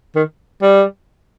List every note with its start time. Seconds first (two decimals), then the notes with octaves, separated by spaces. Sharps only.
0.16 D#3
0.62 G3